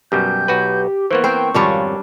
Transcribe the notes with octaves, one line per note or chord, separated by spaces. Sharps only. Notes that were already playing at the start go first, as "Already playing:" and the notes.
F#2 B2 G3 G4 G6
B1 F#4 B4
E3 A#3 B3 C5 C#6
C4 A#4 C5 G5
G#1 F2 G3 C#4 D4 F4 C#5